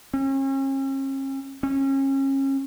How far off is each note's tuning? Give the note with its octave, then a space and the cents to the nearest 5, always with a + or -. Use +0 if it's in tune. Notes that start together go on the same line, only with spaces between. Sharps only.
C#4 -40
C#4 -30